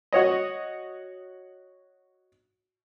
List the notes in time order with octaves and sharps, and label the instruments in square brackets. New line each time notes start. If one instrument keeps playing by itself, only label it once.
[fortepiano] F#4 C#5 D#5